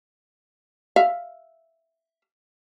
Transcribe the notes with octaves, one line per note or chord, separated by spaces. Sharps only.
E5 F5